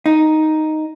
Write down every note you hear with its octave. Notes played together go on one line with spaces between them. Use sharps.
D#4